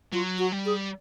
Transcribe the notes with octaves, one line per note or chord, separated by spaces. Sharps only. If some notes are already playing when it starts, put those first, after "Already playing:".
F#3 F4
F#4
G3
G#4